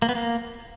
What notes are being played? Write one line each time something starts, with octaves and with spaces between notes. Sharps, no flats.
A#3
B3
A#3